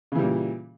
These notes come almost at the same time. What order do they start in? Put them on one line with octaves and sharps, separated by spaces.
C#3 E3 G3 A#2